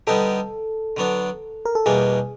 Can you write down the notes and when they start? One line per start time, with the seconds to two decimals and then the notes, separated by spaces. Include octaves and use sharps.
0.07 D3 G3 B3 D#4 G4 A4
0.97 D3 F#3 B3 D4
1.65 A#4
1.75 A4
1.86 E2 B2 G3 A#3 D4 G#4